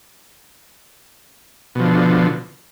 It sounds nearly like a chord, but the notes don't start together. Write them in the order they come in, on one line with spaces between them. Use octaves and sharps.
B2 F3 D3